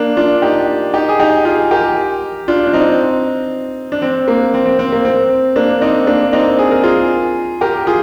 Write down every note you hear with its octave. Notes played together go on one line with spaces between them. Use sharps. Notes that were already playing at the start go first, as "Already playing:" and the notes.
Already playing: A#3 D4
D4 F4
D#4 G4
D#4 G4
G#4
D#4 G4
F4 G#4
G4 A#4
D4 F4
D4
C4 D#4
D4
C4
A#3
C4
C4
C4
A#3
C4
A#3 D4
C4 D#4
A#3 D4
C4 D#4
G#4
A#4
F4 G#4
G4 A#4
F4 G#4